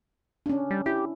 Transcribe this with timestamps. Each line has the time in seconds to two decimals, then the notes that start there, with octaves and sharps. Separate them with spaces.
0.46 C#4 D4
0.71 G3
0.86 E4 G4